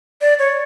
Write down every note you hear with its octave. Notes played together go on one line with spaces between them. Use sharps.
D5
C#5